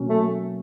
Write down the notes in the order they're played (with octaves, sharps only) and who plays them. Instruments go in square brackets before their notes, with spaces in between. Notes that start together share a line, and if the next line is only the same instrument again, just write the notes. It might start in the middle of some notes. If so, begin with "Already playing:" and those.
Already playing: [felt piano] B2 F#3 A#3 C#4
[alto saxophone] A3